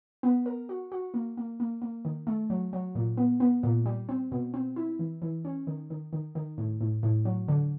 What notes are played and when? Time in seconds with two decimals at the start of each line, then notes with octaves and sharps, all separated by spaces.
0.23 B3
0.46 A#4
0.69 F#4
0.92 F#4
1.14 A#3
1.37 A#3
1.60 A#3
1.82 A#3
2.05 D#3
2.27 A3
2.50 F#3
2.73 F#3
2.95 A#2
3.17 B3
3.40 B3
3.63 A#2
3.86 G3
4.09 C4
4.32 B2
4.54 C4
4.76 E4
4.99 E3
5.22 E3
5.45 C#4
5.67 D#3
5.90 D#3
6.13 D#3
6.35 D#3
6.58 A2
6.81 A2
7.03 A2
7.25 F#3
7.48 D3